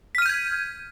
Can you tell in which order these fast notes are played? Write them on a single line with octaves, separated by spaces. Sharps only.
B6 F6 D#7 G6 G#6